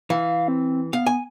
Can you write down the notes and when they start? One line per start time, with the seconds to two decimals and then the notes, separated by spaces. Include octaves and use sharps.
0.10 E3 F5
0.48 C4
0.93 B3 F5
1.06 G#5